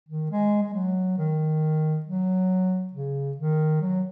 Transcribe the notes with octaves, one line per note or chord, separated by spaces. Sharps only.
D#3
G#3
G#3
F#3
D#3
F#3
C#3
D#3
F#3